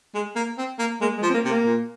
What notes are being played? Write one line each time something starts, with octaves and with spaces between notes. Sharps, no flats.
G#3
A#3
C4
A#3
G#3 A#3
G#3
F3
C4
A#3
C3
A#3
A#2